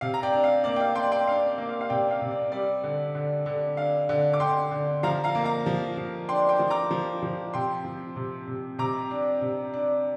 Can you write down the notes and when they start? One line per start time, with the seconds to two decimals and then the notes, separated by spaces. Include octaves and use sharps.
0.01 C3 F5
0.14 A#5
0.23 D5 G5
0.33 D4
0.44 F5
0.64 A#3 D5
0.76 G5
0.80 F5
0.95 D4 G5 C6
1.12 G5 C6
1.27 D4 F5
1.47 D5
1.58 A#3
1.69 F5
1.81 F5
1.90 C3 D5 G5
2.11 F5
2.21 C3
2.31 D5
2.52 G3 D5
2.84 D3
3.15 D3
3.46 D3
3.77 D4 F5
4.09 D3
4.33 D6
4.40 D3 G5 C6
4.71 D3
5.03 F3 F5 A#5
5.24 F5 A#5
5.35 A#3
5.44 F5 A#5
5.66 F3
5.97 F3
6.29 D4 G5 C6
6.49 G5 C6
6.59 F3
6.70 A#5 D6
6.91 F3
7.23 F3
7.54 C3 G5 C6
7.85 F3
8.16 C3
8.47 C3
8.79 C3 A#5 D6
9.11 D4
9.41 C3
9.74 D4